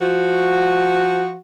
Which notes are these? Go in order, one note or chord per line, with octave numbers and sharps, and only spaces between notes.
F3 F#4